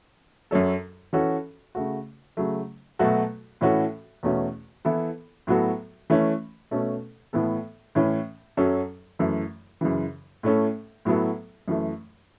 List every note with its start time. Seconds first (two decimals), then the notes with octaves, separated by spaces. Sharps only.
0.51 F#2 F#3 C#4 A4
1.13 E3 C#4 F#4 A4
1.75 C#3 A3 F#4
2.37 C#3 F#3 A3
2.99 B2 F#3 A3 F#4 A4
3.61 A2 E3 C#4 F#4 A4
4.23 E2 B2 A3 C#4 F#4
4.85 E3 B3 E4 A4
5.47 A2 F#3 B3 F#4 A4
6.10 E3 A3 C#4
6.71 B2 A3 C#4 A4
7.33 A2 E3 B3 A4
7.95 A2 E3 C#4
8.57 F#2 F#3 C#4 A4
9.19 F#2 E3 A3 E4
9.81 F#2 C#3 E3
10.43 A2 A3 C#4 A4
11.05 A2 F#3 B3 E4 A4
11.68 F#2 E3 A3